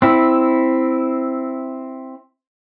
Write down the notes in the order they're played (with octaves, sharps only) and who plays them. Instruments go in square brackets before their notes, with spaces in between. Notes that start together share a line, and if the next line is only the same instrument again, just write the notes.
[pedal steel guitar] C4 E4